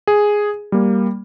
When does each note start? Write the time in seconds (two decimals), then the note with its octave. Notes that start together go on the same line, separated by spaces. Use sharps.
0.07 G#4
0.72 G3 A#3